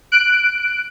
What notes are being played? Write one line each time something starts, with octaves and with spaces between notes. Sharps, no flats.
F#6 D7